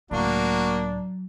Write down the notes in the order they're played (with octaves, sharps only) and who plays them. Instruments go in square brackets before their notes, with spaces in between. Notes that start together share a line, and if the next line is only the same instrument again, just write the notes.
[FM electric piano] C#2 A2 A#5 [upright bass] F#3 [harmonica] A#3 F#4 [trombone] D4